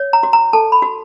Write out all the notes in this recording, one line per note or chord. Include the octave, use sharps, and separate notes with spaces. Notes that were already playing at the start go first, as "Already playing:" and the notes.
Already playing: C#5
A#5
F#4
A#5
A4 A5
B5
F#4